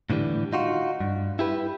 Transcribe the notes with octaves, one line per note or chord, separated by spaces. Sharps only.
A2 D3 E3 G3
D#4 F4 F#4
G2
E4 G4 B4